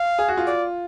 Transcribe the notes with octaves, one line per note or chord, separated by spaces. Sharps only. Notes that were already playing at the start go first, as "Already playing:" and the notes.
Already playing: F5
G#4
F#4
F4
D5